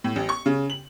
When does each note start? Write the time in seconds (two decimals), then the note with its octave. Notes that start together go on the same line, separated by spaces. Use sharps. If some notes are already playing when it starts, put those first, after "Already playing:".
0.04 A2
0.16 A1
0.29 C#6
0.46 C#3
0.70 F#7